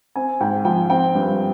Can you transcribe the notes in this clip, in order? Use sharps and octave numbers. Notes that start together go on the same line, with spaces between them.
C4 G#5
G#2 G5
F3 G5
C4 G5
G2